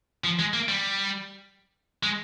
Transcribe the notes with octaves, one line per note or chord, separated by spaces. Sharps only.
F3
G#3
A#3
G3
G#3